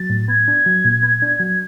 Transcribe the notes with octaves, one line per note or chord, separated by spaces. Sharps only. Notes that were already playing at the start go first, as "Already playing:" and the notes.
Already playing: F#3 A6
A2
B3 G#6
D4
F#3
A#2
B3
D4
F#3